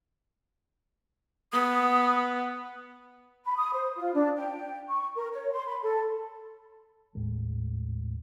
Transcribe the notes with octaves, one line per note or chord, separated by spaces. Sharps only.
B3 D#6
B5
D#6
C5
F4
D4
G5
C#6
A#4
C#5
C6
B5
A4
G#1 D#2 A2 G#3